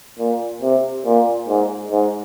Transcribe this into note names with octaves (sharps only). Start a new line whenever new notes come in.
A#2
C3
A#2
G#2
G#2